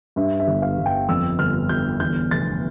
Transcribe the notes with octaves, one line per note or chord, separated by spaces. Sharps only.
G2 E5
E5
G1
F5
G1
G5
F2 E6
G1 F6
G1 G6
E2 G6
F1 A6